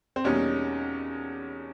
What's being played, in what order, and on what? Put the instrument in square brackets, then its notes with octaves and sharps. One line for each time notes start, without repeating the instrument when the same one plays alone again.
[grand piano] C4
[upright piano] E2 B2 G3 A#3 D#4 [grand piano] C#4